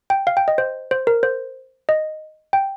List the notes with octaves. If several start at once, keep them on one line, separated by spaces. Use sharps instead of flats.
G5
F5
G5
D#5
C5
C5
A#4
C5
D#5
G5